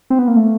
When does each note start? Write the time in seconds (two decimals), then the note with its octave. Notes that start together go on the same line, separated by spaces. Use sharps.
0.10 C4
0.19 B3
0.28 A#3
0.36 A3